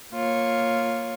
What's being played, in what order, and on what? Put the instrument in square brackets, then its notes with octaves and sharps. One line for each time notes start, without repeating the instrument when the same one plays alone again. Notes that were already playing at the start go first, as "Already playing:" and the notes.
[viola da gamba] A#3 F4 C#5